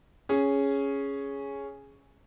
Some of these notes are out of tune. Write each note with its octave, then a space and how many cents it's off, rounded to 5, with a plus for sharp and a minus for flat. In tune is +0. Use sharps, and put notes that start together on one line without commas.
C#4 +0 G#4 +0